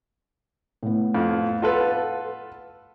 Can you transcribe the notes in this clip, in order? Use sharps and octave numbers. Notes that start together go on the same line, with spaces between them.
A2 B3
F2
F4 A4 B4 F#5